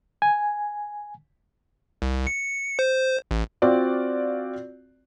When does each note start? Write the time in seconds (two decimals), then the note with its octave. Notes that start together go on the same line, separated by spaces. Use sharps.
0.22 G#5
2.02 C2
2.27 C#7
2.79 C5
3.31 A1
3.62 C4 F4 F#4 D5